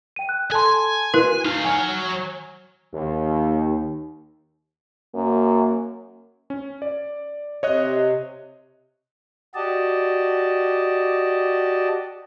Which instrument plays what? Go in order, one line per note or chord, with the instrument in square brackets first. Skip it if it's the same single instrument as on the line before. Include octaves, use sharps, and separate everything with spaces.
[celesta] G5 D#7
F#6
[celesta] A4 A5 C6 [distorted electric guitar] G#5
[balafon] E4 A#4 B4 [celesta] F#4 D#7
[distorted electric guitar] A3 F5 [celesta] D#4
[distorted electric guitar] F#3 C#5 [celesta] G#5 F6
[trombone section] D#2
[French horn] F#2 [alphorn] A#3
[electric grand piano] C#4
D5
[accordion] C3 [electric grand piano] C#5 D#5 F#6
[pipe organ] F#4 G4 D5 D#5 A5